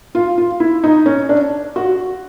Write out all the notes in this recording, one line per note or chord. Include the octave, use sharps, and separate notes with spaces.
F4
F4
E4
D#4
C#4
D4
F#4